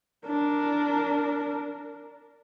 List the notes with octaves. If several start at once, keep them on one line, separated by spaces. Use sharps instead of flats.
D4 A#4